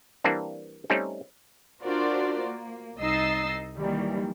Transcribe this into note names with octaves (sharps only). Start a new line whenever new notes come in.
E3 G3 A#3 C4 D4
G3 A3 C4 C#4 D#4
D4 F4 F#4 A#4 C5 D5
A#3
C2 D#4 D#5 E6 A6 C7
D#3 E3 F#3 G3 A#3